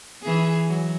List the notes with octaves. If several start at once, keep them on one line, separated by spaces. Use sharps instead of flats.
E3 G#4
F#3